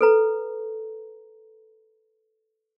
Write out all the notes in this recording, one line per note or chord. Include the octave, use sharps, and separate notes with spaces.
A4 B4 A#5